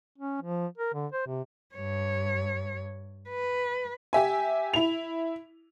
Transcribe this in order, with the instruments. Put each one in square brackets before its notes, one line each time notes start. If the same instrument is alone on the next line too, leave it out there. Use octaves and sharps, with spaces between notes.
[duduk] C#4
F3
A#4
D3
C5
C3
[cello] G2 C#5
B4
[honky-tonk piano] G4 E5 G#5
E4 F7